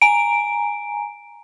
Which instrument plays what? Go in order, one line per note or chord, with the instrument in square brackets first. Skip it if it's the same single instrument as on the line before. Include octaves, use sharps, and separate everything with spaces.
[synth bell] G#5 A#5 D7